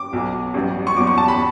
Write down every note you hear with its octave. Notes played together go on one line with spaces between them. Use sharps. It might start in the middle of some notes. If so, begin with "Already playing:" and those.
Already playing: D6
B1 B2 F#3
A1 G2 F#3
C#6
E2 B2 F#3 D6
C#6
A5
B5